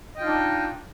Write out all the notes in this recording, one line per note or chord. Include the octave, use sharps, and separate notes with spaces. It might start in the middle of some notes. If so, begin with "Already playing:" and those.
D4 D#4 F4 D#5 G5